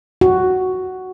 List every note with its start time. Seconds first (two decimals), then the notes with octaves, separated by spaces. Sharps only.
0.21 F#4